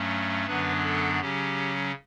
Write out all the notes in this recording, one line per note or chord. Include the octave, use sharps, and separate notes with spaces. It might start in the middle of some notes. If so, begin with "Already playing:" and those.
Already playing: G2 F#3 A3 C#4
F#2 D3 F#3 B3 D4 B4
A4
C#3 F#3 C#4 G4